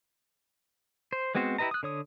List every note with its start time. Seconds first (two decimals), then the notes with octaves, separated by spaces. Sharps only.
1.13 C5
1.35 G#3 B3 C4 F#4 C5
1.58 E4 G4 B4 D#5 A#5
1.71 D#6 F#6
1.83 D3 C#5 D#6